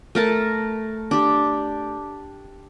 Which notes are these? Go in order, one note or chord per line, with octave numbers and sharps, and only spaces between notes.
A3 A#4 A5
D4 G4